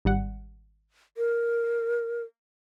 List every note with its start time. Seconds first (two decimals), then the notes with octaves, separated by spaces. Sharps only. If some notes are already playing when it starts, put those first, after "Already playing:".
0.05 G#1 G3 F#5
1.17 A#4